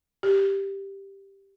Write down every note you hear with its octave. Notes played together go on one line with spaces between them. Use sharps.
G4